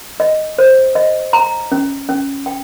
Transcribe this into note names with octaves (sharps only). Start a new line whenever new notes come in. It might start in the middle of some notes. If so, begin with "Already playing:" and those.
D#5
C5
D#5
A#5
C#4
C#4
G5